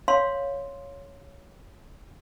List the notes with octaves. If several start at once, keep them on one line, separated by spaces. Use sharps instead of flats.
C#5 F5 C6